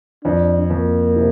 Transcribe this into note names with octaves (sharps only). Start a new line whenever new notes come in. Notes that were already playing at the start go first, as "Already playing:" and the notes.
F2 D4
F2 A#3
C3